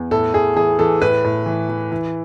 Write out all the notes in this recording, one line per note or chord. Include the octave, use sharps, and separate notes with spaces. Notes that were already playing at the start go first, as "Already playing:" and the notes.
Already playing: E2
A2 A4
A2 G#4
E3 G#4
E3 A4
A2 B4
A2
E3
E3
E3